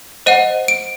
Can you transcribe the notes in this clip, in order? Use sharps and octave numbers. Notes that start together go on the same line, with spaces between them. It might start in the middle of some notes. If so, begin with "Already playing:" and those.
C5 D#5 F#5 D#7
D7